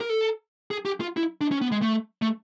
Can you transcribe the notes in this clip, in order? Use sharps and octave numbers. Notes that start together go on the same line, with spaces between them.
A#4
A4
G#4
G4
F4
E4
D4
C#4
B3
G#3
A3
A3